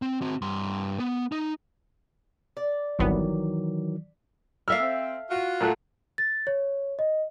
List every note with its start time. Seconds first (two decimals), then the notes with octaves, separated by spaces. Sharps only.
0.02 C4
0.22 C4 F#4
0.42 G2 C6
1.00 B3
1.32 D#4
2.57 D5
2.99 G1 C2 D#3 E3 F#3 B3
4.68 A#3 A4 E5 F5 F6
4.80 C4
5.29 F4 F#4
5.61 A#2 A3 F#5
6.18 A6
6.47 C#5
6.99 D#5